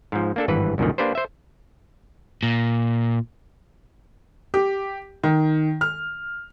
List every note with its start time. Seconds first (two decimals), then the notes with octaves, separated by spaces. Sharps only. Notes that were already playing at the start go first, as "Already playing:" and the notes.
0.12 G#2 F3
0.36 A#3 D4 A4
0.48 G#1 G2 E3 B4
0.78 C2 F#2 A#2 D3 D#3
0.98 A#3 D4 G4 B4 C5
1.15 C5 E5
2.43 A#2
4.54 G4
5.24 D#3
5.81 F6